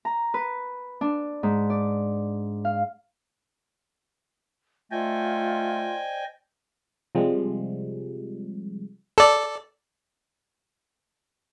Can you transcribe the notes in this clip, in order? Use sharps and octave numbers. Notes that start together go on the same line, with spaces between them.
A#5
B4
D4
G#2
D5
F5
A3 F4 C5 D5 D#5 G5 G#5
C3 F3 G3 G#3
A4 D5